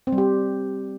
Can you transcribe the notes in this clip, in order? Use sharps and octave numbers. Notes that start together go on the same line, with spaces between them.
C4
G3
G4